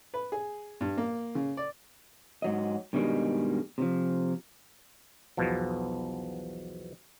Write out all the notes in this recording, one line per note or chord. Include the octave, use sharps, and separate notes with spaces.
B4
G#4
G2
A#3
C#3
D5
G#2 F#3 D#5
G2 B2 D#3 G3 G#3
C3 E3 F3
B1 E2 B2 F3